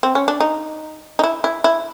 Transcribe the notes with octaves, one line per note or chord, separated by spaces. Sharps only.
C4
C#4
D4
D#4
D#4
E4
E4
E4